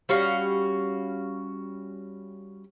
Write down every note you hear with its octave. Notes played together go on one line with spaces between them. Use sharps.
G3 C#4 F#4 F5